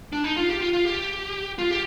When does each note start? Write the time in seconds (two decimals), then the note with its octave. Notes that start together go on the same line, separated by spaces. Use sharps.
0.13 D4
0.24 D#4
0.36 F4
0.49 G4
0.61 F4
0.73 F4
0.85 G4
1.59 F4
1.71 G4